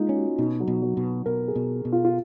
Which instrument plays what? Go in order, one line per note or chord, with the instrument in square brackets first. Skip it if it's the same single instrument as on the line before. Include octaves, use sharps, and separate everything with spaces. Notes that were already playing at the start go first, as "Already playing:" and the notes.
Already playing: [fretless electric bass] G#3 [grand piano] A#3 D#4 F4
[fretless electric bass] C#4
[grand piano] F#4
[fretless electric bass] B2 [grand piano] D#4
[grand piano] F#3
[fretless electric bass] B2
[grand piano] F#3
[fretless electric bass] B2
[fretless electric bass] B2 [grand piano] A#4
[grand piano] G#4
[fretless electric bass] B2
B2
[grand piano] F4
F4